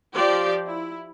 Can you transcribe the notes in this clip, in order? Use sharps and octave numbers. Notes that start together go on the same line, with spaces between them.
F3 G4 C5 D5
E4